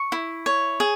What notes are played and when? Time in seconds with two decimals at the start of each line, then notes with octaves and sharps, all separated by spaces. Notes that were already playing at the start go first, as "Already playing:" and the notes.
Already playing: C#6
0.12 E4
0.46 C#5
0.80 G#4